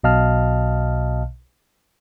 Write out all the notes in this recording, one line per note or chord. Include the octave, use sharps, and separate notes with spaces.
B1 B2 D#5 F5 A5 F6